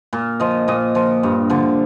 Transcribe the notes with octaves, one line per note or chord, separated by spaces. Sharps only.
A#2
F3 D#5
A#2 D#5
F3
G2
D3 F3